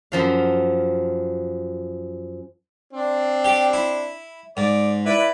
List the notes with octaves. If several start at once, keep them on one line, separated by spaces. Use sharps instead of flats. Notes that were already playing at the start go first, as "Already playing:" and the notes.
F#2 F3 F5
C4 D4
G4 D5
E4
G#2 D5
E4 B4 D5